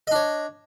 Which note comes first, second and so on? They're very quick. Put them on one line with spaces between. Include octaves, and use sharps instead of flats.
D#5 D4 C#5